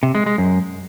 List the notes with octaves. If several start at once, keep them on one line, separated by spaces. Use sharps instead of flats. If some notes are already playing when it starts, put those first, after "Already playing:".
C3
G#3
G#3
F#2